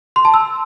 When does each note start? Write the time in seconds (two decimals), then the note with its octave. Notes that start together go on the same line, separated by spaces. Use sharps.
0.16 C6
0.25 A5
0.34 E6